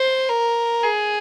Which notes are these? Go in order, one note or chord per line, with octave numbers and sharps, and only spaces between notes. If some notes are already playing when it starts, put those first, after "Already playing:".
Already playing: C5
A#4
G#4